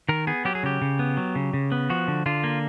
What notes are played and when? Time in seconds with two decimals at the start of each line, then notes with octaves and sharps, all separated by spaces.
0.09 D#3 A#4
0.27 B3 G#4
0.45 F#3 G4
0.55 G#4
0.63 C#3 G4
0.82 C#3
0.99 B3
1.17 F#3
1.35 C#3
1.54 C#3
1.72 B3
1.90 F3 F#4
2.08 D3
2.26 D3 F4
2.44 A#3